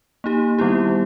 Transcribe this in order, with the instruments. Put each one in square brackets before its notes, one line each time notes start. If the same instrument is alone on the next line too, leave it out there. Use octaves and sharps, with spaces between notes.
[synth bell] A#3 D#4 G4
D#3 G3 B3 E4 G4